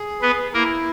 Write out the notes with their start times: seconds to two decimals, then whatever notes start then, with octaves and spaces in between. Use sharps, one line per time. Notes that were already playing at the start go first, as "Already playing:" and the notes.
Already playing: G#4
0.22 B3 B4
0.53 A#3 E4 A#4